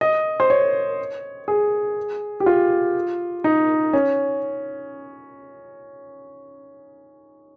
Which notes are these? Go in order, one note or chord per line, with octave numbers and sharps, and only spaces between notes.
D#5
C5
C#5
G#4
G4
F4
D#4
C#4